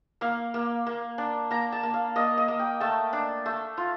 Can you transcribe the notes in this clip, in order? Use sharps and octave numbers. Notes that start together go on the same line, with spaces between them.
A#3 F5
A#3
A#3
D4
A#3 A#5
A5
A#3
F5
A#3 D#5
D#5
A#3
G5
A3 A5
D4
A3
F4